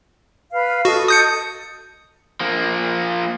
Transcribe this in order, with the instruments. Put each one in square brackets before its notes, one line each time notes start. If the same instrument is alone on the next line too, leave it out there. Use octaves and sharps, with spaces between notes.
[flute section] B4 F5
[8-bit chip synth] F#4 [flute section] A4 D#5
[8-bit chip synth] D#6 G6 C#7
[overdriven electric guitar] F3 A#3